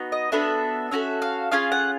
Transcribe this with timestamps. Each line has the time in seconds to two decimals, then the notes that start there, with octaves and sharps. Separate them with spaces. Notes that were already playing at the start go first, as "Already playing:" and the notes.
Already playing: B3 D#4 F#4
0.12 D#5
0.32 B3 D4 F#4 A4 E5
0.91 C#4 F#4 A4 E5
1.22 F5
1.51 C#4 F4 G#4 F5
1.72 F#5